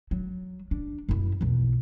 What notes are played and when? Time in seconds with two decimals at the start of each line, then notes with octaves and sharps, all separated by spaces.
0.11 F#3
0.71 D4
1.09 F#2 E4
1.41 B1 E2